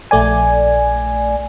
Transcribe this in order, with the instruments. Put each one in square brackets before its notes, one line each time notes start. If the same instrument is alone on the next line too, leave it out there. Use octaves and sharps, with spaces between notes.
[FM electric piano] A#1 A3 D5 G#5